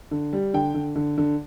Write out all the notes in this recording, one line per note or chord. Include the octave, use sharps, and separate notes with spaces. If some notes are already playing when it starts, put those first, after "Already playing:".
D3
G3
D3 G5
D3
D3
D3